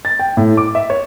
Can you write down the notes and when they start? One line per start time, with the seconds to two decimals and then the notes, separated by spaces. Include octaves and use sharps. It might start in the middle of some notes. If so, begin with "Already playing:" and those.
0.05 A6
0.19 G5
0.37 A2
0.57 D6
0.75 E5
0.90 C#5